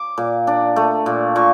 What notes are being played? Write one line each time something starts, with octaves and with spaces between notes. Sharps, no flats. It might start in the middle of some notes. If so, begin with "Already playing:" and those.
Already playing: D6
A#2
D4
A3
A#2
A#2 C#6